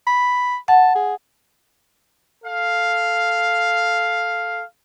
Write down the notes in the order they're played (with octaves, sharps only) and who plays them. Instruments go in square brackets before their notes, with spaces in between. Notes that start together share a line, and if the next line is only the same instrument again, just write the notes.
[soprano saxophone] B5
[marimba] F#5 [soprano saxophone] A5
[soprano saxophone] G#4
[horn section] A4 F5